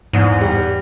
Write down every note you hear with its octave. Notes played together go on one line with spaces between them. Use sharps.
E2 G#2
G3